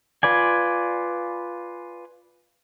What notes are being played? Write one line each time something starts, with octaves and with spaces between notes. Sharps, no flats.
F4 B4 D5 G#5